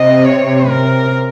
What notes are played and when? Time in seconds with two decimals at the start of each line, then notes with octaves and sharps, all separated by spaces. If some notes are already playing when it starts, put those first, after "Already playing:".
Already playing: C3 D#5
0.25 C#5
0.69 C3 A#4